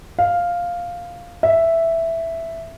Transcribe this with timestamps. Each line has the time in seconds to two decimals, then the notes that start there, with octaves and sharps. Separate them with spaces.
0.19 F5
1.43 E5